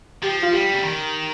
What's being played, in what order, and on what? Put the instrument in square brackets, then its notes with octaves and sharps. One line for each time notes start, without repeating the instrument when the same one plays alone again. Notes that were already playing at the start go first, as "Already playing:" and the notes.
[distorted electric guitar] F3 [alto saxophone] G4
[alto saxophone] F4
[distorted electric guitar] G3 [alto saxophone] G4
[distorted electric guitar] C#3
D#3